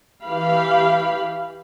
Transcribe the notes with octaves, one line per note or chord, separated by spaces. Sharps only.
E3 G4 F5 B5